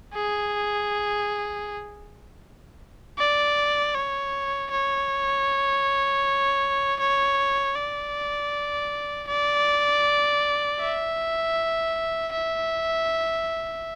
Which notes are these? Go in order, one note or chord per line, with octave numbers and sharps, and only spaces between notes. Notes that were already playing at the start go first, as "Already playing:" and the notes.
G#4
D5
C#5
C#5
C#5
D5
D5
E5
E5